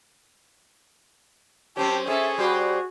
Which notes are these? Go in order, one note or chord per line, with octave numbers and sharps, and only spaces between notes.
F#2 C4 C#4 G4 G5 A5
C#4 G#4 A4 E5
G3 F#4 G4 C5